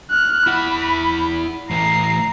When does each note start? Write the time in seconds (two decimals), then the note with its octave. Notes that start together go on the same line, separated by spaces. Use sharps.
0.11 F6 F#6
0.47 E4 F#5 B5
1.71 A2 E3 A#5 C7